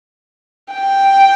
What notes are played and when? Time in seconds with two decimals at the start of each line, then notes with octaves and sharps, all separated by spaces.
0.74 G5